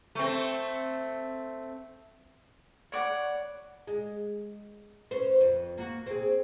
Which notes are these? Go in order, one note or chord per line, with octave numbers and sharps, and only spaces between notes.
A3 C4
C#5 D5 F#5 B5
G#3
C#4 B4 C5
F2
A#3 F#4
C4 G#4